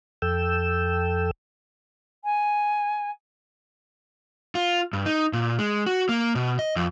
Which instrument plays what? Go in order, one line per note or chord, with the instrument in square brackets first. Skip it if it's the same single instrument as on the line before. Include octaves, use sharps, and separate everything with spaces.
[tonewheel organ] F2 A4 G5 E6
[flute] G#5
[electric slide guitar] F4
G2
D#4
A#2
G#3
F#4
A#3
B2
D#5
F2